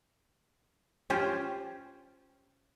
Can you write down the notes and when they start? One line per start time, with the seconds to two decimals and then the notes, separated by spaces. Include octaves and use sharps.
1.10 C#4 F4 G4 C5